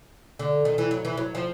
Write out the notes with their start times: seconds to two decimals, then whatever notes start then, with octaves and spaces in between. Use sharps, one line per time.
0.39 D3
0.65 D#3
0.78 E3
0.91 F#3
1.05 E3
1.17 F#3
1.35 F3